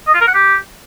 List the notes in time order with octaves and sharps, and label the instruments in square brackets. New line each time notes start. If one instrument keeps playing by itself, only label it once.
[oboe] D#5
F4
A#4
F#5
G4